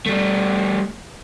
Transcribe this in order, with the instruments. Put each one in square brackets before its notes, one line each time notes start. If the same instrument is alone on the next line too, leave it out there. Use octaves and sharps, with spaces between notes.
[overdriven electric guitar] G3 A3